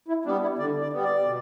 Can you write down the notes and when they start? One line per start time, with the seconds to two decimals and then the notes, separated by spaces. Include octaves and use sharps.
0.08 E4
0.25 G3 B3 D4
0.42 E4
0.59 D3 D5
0.81 D5
0.92 G3 B3
1.04 D5
1.26 B2